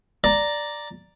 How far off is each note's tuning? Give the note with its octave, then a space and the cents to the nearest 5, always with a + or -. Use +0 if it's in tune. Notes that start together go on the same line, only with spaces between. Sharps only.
D5 +0 A#5 +0